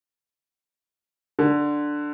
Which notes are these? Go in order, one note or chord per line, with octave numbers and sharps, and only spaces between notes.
D3